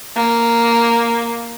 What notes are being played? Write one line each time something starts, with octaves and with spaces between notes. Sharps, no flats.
A#3